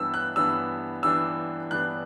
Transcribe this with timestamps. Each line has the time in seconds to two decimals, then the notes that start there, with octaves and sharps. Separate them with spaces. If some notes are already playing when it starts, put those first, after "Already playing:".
Already playing: G2 E3 B3 D4 E6
0.14 F#6
0.36 G2 E3 B3 D4 E6
1.03 G2 E3 B3 D4 E6
1.70 G2 E3 B3 D4 F#6